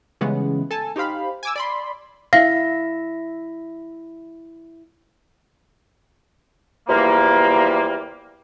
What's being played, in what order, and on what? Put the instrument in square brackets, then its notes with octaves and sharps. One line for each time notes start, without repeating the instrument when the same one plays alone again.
[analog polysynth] C#3 E3 G3 G#3 B3 C#4
A4 G#5 A5
D#4 G4 C5 F5 B5
G#5 D6 E6
D5 B5 C6
[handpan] E4 E5 [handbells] F5 [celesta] A#6
[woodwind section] E2 E3 F3 G3 A#3